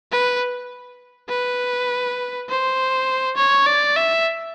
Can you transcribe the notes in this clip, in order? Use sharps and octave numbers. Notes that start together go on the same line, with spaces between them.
B4
B4
C5
C#5
D5
E5